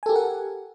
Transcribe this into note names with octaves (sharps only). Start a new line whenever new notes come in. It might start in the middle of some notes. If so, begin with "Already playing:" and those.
G4 A4 A#4 F#5 G#5